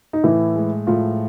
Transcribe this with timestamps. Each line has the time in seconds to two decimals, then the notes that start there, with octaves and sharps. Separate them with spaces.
0.13 D#4
0.23 A2 E3 E4
0.56 G#3
0.87 A2 F3 F4